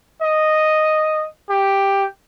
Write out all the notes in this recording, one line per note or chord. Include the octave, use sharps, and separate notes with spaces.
D#5
G4